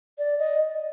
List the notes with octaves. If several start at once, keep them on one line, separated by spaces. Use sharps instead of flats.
D5
D#5